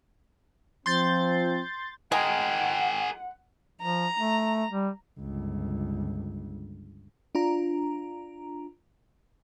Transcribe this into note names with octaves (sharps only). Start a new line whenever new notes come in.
F3 C4 C6 G6 A6
G#3 G#4 A#4 F#5 G5
F3 A#5
A3
G3
G1 C#2
D4 F4 A#5